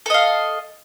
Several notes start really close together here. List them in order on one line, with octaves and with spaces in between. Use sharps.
A4 D#5 F5